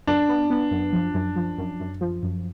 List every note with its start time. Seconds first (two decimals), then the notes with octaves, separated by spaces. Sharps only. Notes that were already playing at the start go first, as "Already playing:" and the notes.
0.07 F#2 D4
0.29 B3
0.50 B3
0.71 F#2
0.93 F3
1.14 F#2
1.36 F3
1.58 F#2
1.80 F#2
2.01 F3
2.23 F#2